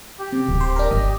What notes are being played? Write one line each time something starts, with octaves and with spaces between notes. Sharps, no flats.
G4
C3
D1
C5
D4 A#4
G1 D#5